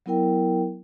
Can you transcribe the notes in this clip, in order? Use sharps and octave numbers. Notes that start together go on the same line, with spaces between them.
F#3 B3 E4 A#4 G5